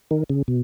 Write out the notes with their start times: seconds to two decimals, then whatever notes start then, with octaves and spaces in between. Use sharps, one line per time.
0.11 D#3
0.30 C#3
0.48 B2